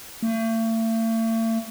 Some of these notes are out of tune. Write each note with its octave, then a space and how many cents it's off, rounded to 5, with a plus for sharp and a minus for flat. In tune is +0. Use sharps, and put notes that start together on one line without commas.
A3 +40